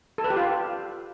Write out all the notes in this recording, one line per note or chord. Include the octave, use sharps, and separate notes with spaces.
A4
B4
G4
F4